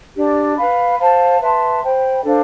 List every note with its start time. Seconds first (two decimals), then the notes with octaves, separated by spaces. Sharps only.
0.15 D4 G4 D5
0.57 B4 F5 B5
0.99 C5 F5 A5
1.41 B4 E5 A5 C6
1.82 C5 G5 B5
2.24 D4 A4 C5 F5